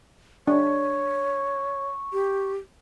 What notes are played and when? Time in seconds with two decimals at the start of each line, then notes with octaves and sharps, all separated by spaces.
0.47 D4 C#5 C#6
2.13 G4